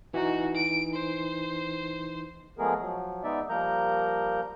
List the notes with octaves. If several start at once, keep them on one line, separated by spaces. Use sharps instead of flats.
E3 D#4 F#4
D7
C5
F3 G#3 A3 B3 G#4 A#4
F3 F#3
G#3 B3 D#4 D5 E5
F3 G3 A#3 A#4 A#5 G6